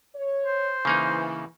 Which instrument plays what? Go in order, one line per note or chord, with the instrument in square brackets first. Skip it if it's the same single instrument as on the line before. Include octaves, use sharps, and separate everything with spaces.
[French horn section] C#5
[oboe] C5
[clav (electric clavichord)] C#3 A#3 D#4 [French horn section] E3